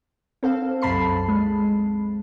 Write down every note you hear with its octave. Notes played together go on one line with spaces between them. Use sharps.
C4 A4 F5
C2 F#2 A5 B5 C7
G#3